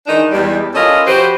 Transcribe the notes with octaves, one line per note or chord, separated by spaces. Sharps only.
D#3 E3 G#3 D4 D#4
E2 G3 G#3
C#4 E4 F4 A4 A#4 D#5
F3 F#4 G4 B4 C5